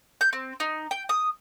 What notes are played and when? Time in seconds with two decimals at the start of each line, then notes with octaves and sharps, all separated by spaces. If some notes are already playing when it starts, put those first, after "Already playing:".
0.21 G6
0.33 C4
0.60 D#4
0.91 G5
1.09 D#6